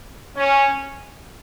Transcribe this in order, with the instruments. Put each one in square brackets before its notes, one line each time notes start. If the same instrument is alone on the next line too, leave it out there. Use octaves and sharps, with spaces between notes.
[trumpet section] C#4